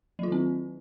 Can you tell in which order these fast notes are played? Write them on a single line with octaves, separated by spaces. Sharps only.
F#3 F4 D#3 C4